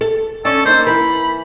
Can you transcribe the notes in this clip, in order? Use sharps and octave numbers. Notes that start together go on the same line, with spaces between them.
A4
C#4 D4 A4
A#3 D#4 C5
E3 A#4 B5